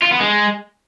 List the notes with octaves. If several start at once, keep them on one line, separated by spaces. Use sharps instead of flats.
F4
B3
G#3